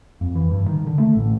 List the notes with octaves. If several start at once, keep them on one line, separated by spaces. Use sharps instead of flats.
F2
E3
G2
D#3
D3
A3
A1